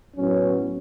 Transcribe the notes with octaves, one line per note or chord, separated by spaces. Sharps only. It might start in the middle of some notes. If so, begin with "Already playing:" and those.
A2 F#3 B3 C#4